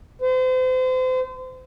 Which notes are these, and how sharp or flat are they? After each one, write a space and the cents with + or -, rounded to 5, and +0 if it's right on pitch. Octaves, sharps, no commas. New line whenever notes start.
C5 -35